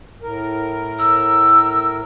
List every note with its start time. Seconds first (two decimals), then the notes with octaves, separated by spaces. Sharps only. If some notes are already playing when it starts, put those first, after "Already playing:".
0.22 A2 A#4
0.99 E6